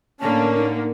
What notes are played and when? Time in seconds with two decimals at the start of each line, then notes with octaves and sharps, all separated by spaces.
0.20 A2 D3 A#3 C#4 A5
0.56 D#4